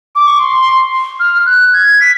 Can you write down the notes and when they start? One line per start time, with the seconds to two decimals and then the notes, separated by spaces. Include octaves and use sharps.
0.15 D6
0.27 C#6
0.40 C6
1.20 F6
1.46 F#6
1.73 G#6
2.00 B6